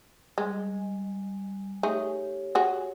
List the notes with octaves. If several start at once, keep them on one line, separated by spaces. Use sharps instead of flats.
G3 G#3 G#5
A3 D#4 G4 G#4 C#5
F#4 G#4